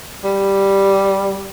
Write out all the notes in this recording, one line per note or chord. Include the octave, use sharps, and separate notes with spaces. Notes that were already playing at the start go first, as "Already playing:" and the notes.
G3